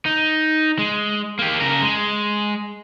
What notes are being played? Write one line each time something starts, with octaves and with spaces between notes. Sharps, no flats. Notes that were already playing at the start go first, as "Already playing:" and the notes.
D#4
G#3
A#3 G4
C#3 A#4
G#3